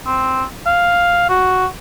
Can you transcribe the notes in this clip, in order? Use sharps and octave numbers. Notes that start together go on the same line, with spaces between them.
C4
F5
F#4